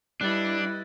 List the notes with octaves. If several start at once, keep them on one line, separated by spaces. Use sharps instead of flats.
G3 D4 E4 B4 D#5 F#6 A6